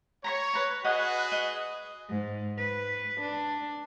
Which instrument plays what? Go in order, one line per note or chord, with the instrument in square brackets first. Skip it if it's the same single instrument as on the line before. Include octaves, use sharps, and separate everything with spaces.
[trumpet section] C#5 [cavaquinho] A#5 B5 C#6
[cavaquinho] B4 A#5
[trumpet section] F#4 G#4 B4 [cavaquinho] D#5 F#5
[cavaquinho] D#5
[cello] G#2
B4
D4